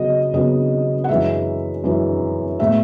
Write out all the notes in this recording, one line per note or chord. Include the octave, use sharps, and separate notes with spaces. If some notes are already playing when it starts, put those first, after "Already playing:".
Already playing: C#3 F#3 B3 D#5
C#3 F#3 B3 D#5
F#5
F#2 E3 G#3 E5
F#2 E3 G#3
A2 G#3 B3 E5